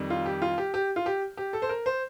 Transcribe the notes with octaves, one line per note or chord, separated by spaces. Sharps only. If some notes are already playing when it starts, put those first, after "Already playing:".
Already playing: F2 D#3 G3
F4
G4
F4
G4
G4
F4
G4
G4
A4
C5
A#4
C5